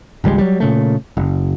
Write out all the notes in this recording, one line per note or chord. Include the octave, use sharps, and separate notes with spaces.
G#1 C#2 G3 G#3
F#3 G3
A#2 C#3 A3
F#1